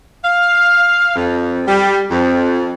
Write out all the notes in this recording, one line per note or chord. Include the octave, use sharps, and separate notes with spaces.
F5
F2
G3
F2